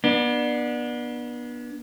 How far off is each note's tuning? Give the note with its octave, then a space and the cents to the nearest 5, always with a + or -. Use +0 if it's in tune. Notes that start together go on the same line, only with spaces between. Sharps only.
B3 -30 D4 +20